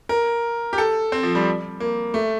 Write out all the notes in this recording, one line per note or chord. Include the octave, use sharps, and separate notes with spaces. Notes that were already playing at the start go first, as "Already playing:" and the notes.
A#4
G4
A4
C4
F3
G3
A#3
A3